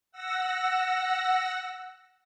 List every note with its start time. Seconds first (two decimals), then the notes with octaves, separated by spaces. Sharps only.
0.12 F#5 E6 A#6